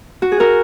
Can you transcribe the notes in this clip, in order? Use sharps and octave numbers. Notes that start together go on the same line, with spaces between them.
F#4
G#4
F#4 A#4